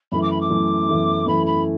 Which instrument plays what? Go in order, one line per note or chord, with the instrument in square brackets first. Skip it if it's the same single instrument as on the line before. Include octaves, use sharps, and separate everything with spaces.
[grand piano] F#2 E3 A3 E4 [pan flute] B5
[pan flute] D6
B5
D6
[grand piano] F#2 E3 A3 E4
F#2 E3 A3 E4
[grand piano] F#2 E3 A3 E4 [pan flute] B5
[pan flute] B5